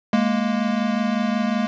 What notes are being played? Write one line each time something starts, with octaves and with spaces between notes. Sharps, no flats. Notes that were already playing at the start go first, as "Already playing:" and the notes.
G#3 A#3